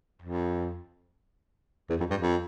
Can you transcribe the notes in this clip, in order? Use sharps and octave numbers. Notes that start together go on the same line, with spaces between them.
F2
E2
F2
G2
F2